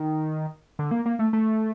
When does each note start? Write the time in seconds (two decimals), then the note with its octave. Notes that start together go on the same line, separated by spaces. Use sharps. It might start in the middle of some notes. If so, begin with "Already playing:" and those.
Already playing: D#3
0.79 D3
0.91 A#3
1.06 A#3
1.19 A3
1.33 A3